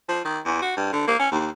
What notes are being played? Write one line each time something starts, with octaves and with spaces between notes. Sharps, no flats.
F3
D#3
E2
F#4
G2
D3
A#3
C#4
D#2